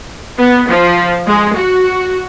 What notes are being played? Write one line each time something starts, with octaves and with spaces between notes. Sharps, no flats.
B3
F3
G#3
F#4